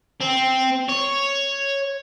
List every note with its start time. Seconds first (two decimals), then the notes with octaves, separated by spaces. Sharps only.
0.21 C4
0.89 C#5